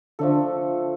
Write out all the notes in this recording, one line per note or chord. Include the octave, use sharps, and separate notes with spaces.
D3 F3 A3 D4 A4